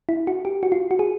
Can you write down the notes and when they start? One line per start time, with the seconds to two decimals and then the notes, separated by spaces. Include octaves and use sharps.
0.09 E4
0.27 F#4
0.45 G4
0.63 F#4
0.72 F4
0.91 F#4
0.99 G#4